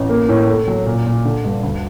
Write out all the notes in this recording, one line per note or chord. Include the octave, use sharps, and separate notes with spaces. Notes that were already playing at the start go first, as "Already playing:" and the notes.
Already playing: A1
A#3
A2
A3
F#3
A#2
A#2
D3
G2
D2